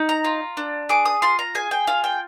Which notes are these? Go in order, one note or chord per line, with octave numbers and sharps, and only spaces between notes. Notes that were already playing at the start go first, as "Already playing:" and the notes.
Already playing: D#4
A#5
F4
D4
G#4 D6
D#6
F4 C6
A#5
G#4 G#5
G5
F4 F5
G5